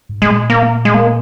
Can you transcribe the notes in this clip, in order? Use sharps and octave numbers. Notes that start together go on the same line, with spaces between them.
G#2
A#2 G#3
A#3
G#3
A#3